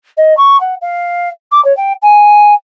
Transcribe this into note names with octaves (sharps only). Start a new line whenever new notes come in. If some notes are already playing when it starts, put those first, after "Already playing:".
D#5
C#6
F#5
F5
D6
C#5
G5
G#5